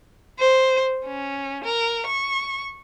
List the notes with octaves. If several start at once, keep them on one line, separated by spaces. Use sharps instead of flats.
C5
C#4
A#4
C#6